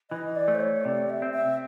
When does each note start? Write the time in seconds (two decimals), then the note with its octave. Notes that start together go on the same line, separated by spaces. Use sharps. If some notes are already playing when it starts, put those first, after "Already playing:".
0.10 E3 D#5
0.36 D5
0.48 A3
0.55 C5
0.60 C#5
0.84 C3 D5
1.10 E5
1.22 C4
1.34 E5